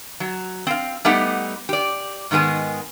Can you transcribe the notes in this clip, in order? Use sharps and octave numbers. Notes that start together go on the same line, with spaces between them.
F#3
C4 F5
G3 A3 B3 D#4 G4 F#5
G4 D5
G#2 D#3 G#3 B3 G#4